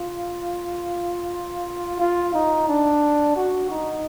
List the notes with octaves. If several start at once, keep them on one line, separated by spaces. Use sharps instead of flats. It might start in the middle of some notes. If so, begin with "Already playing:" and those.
Already playing: F4
F4
D#4
D4
F#4
D#4